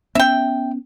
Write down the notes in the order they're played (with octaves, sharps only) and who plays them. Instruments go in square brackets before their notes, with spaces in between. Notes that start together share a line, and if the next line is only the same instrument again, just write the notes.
[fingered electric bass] B3 C#4 [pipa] E5 G5